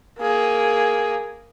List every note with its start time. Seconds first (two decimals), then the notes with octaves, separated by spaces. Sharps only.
0.19 A#3 G#4